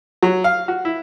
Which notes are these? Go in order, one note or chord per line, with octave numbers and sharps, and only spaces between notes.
F#3
F5
F#4
E4